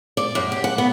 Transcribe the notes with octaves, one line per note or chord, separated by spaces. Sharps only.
D5
F#2
G4
F#5
B3